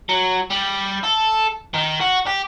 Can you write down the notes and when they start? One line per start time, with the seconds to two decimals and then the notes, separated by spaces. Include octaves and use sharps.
0.09 F#3
0.50 G3
1.04 A4
1.74 D#3
2.00 F#4
2.26 G4